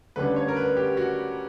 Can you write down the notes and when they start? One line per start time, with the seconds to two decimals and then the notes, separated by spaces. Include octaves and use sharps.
0.16 D2 D3 G3 C#4 B4
0.36 C#5
0.48 A#4
0.57 B4
0.77 G4
0.97 F#4